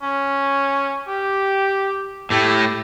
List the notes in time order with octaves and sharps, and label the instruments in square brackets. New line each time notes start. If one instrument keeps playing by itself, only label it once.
[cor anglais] C#4
G4
[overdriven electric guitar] A2 A3 [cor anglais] G4